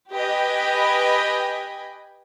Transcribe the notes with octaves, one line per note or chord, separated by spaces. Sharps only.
G4 B4 D#5 G5 G#5 B5